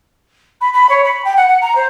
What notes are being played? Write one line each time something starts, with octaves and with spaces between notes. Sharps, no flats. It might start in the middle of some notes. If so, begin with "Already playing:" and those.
B5
B5
C#5
B5
G5
F#5
F#5
A#5
C5